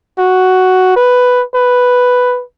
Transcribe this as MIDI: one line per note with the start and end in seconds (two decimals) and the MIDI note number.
0.18 0.92 66
0.96 1.43 71
1.54 2.43 71